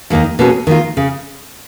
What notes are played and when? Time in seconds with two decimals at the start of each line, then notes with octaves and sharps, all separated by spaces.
0.10 D#2 D#3 A#3 D#4
0.39 B2 A#3 C#4 G#4
0.67 D#3 A#3 F4
0.97 C#3